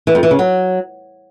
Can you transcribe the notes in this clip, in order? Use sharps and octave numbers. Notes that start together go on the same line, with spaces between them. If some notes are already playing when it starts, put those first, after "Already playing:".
E3
F2
E3
C#3
F#3